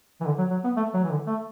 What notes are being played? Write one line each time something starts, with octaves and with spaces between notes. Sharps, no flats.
E3
D3
F#3
F#3
B3
A3
F#3
E3
D3
A3